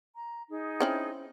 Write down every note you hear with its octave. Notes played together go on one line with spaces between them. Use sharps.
A#5
D#4 G#4
C4 C#4 E4